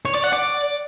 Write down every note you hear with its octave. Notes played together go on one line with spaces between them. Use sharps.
C#5
D5
F#5
D5